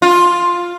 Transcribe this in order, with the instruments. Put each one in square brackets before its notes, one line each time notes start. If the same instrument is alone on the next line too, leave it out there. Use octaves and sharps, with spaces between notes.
[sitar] F4